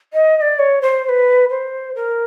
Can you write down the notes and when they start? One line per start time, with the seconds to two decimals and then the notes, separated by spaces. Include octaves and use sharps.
0.13 D#5
0.37 D#5
0.41 D5
0.59 C#5
0.82 C5
1.04 C5
1.09 B4
1.50 C5
1.96 A#4